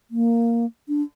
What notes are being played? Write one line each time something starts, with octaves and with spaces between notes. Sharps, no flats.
A#3
D4